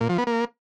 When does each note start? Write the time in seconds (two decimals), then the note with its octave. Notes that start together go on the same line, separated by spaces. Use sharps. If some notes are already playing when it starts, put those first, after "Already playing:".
0.01 A#2
0.09 F3
0.18 B3
0.27 A#3